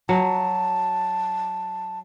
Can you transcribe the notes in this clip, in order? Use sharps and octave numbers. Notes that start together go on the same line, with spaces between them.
F#3 A5